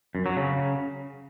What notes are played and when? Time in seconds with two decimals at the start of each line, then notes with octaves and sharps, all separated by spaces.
0.15 F#2
0.26 F#3
0.37 C#3